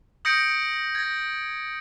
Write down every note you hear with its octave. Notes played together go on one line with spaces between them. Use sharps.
D#6 G6 A#6 C#7 D7
G#6 A#6